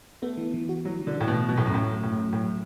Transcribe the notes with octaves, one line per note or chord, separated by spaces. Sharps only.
A3 B3
E3
E3
F#4
E3 F#3
E3
D3
A2 E3
B2
B3
B2 F#3
A2
F#2 A3
A2
F#3
F#3
A2
F#2 A3
A2 F#3
F#3